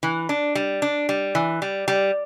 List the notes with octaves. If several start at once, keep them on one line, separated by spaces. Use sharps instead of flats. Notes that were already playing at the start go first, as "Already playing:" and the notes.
E3
D4
G3
D4
G3
E3
G3
G3